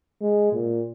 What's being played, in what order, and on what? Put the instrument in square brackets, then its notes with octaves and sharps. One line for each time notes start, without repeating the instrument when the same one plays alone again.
[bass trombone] G#3
A#2